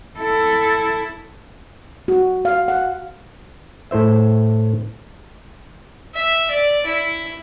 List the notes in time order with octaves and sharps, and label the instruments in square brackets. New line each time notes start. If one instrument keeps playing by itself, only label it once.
[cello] E4 A4
[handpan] F#4
F5
F#5
[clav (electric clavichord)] A2 E4 C5 E5
[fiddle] E5
D5
E4